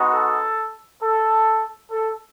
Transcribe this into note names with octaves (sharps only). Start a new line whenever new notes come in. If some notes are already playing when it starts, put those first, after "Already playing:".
Already playing: G#3 B3 D#4 F#4
A4
A4
A4